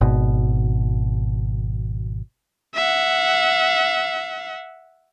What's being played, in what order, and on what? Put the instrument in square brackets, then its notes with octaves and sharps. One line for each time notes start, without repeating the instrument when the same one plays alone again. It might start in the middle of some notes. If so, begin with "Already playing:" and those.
[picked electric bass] G#1 B2
[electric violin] E5 F#5